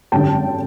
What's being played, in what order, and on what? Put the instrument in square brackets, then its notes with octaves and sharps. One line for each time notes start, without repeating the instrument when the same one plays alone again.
[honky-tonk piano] G#1 F#2 D3 G3 G5 A5